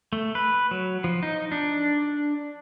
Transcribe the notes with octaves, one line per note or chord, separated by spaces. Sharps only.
A3
B4
F#3
F3
D#4
D4